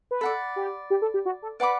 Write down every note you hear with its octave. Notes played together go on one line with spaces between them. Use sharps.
B4
A4 D5 F#5 B5
G4
G4
A4
G4
F#4
A4
B4 D5 F#5 B5 D6